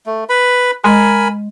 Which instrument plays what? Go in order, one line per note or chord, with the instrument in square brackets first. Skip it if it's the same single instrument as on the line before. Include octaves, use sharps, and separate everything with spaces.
[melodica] A3
B4 B5
[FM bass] G#3 [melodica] A#4 G#5 B5